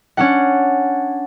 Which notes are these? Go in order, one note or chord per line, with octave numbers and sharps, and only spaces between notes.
C#4 D4 F#5